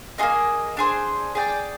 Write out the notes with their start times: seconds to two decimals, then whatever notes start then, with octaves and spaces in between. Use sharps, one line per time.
0.18 A#3 F4 G#4 D#5
0.77 D4 G#4 C5
1.35 G#4 D5 G5